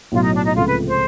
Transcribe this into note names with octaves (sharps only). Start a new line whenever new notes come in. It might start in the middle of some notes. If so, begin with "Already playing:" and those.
B1 A2 F#3 F4
D#4
D4
D#4
C#2 C3 F3 A3 F4
B4
C5